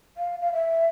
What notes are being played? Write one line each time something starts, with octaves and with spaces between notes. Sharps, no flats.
F5
F5
E5